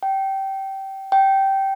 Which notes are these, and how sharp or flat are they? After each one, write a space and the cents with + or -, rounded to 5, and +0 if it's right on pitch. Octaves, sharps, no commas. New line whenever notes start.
G5 -20
G5 -15